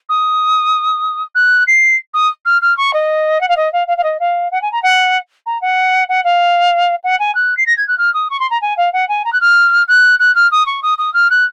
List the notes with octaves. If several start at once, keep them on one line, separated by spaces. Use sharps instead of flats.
D#6
F#6
C7
D#6
F6
F6
C#6
D#5
F#5
F5
D#5
F5
F5
F5
D#5
F5
F#5
G#5
A#5
F#5
A#5
F#5
F#5
F5
F#5
G#5
F#6
C7
A#6
G#6
F#6
F6
D#6
C#6
C6
A#5
G#5
F5
F#5
G#5
A#5
F#6
F6
F#6
F#6
F6
D#6
C#6
D#6
D#6
F6
F#6